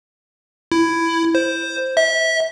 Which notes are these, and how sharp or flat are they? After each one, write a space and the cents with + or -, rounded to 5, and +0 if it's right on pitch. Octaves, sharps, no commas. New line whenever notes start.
E4 +10
C5 +5
E5 -25